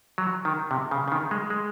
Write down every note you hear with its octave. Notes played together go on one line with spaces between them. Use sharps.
F#3
D#3
C3
C#3
C#3
D#3
G#3
G#3